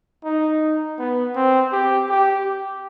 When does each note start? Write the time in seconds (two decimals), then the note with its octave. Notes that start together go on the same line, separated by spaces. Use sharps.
0.24 D#4
0.99 B3
1.35 C4
1.72 G4
2.09 G4